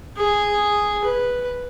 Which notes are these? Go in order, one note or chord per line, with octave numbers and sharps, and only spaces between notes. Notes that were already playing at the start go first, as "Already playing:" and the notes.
G#4
B4